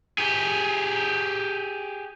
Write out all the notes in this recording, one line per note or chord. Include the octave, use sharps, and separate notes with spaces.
G4 G#4